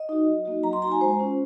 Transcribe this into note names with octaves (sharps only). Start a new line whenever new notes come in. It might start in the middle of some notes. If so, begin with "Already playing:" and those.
Already playing: D#5
D#4 F#4
F#3
A#3 D#4 F#4
F#3 A#5
C6
A#3 D#4 F#4 A#5
G#5
G#3 C5
C#4 F4